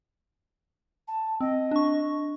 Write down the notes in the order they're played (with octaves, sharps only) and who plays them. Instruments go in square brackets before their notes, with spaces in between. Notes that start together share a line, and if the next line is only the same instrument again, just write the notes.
[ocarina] A5
[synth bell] C4 [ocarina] D#5
[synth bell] D4 C#6